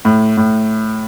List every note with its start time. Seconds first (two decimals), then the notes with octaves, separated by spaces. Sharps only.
0.05 A2
0.37 A2